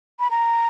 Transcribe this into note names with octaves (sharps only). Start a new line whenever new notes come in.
B5
A#5